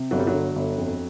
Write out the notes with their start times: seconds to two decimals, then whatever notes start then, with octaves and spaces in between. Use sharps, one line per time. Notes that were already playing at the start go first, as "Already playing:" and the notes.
Already playing: C3
0.11 G1 F#3
0.19 G3
0.27 F#3
0.34 D3
0.55 G1
0.78 F2